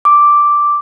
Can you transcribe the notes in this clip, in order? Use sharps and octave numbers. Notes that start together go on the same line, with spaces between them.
D6